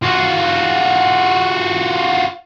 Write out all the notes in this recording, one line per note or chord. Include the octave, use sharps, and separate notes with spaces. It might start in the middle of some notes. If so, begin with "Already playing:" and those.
F4 F#4